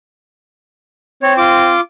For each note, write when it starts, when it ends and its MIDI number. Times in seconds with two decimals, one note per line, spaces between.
1.23 1.74 60
1.23 1.33 73
1.38 1.80 65
1.38 1.80 86